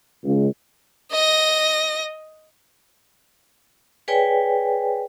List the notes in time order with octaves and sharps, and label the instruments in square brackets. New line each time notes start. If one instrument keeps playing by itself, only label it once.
[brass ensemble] C#2
[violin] D#5 A#6
[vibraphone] G#4 B4 C#5 D5 G5 G#5